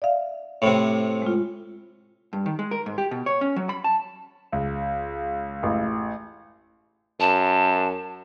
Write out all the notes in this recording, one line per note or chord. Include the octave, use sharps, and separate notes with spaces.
D5 E5 F5
A2 C3
G#3 F4
G2
D#3
G#3
A#4
G#2
G4
B2
C#5
C#4
F#3
B5
A5
C#2
A1
F#2 A5